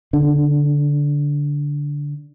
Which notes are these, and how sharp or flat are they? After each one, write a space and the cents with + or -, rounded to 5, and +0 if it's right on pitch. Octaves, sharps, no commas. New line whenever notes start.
D3 -15 D4 +30